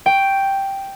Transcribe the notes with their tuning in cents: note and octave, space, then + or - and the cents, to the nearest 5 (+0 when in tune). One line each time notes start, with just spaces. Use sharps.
G5 +0 C#6 +0